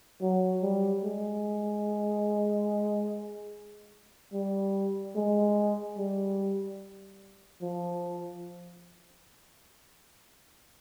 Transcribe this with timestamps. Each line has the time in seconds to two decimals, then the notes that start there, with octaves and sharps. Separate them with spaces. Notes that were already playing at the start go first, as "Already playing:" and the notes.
0.21 F#3
0.62 G3
1.04 G#3
4.33 G3
5.16 G#3
5.97 G3
7.62 F3